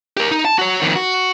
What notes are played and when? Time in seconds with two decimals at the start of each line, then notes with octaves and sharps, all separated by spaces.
0.17 G4 A#4
0.31 D#4
0.45 A5
0.59 F#4 C#5
0.81 F2 D#3
0.95 F#4